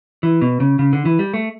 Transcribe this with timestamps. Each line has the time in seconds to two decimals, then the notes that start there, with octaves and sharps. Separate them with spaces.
0.23 E3
0.42 B2
0.60 C#3
0.79 C#3
0.93 D3
1.05 E3
1.19 G3
1.34 A3